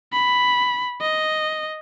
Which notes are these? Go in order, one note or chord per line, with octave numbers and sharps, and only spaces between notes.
B5
D#5